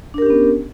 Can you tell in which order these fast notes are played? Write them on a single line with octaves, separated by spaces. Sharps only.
D4 A#4 G4 C#4 B3